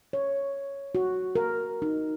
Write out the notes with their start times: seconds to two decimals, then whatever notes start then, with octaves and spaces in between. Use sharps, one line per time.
0.13 C#5
0.95 F#4
1.35 A#4
1.82 D#4